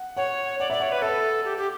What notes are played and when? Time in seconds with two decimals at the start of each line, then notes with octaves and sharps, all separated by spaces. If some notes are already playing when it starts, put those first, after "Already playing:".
Already playing: F#5
0.17 C#5 F#5
0.60 D5 F#5
0.70 D5 E5
0.80 C#5 F#5
0.92 B4
1.02 A4 E5
1.45 G4
1.57 G4